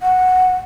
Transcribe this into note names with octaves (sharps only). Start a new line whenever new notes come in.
F#5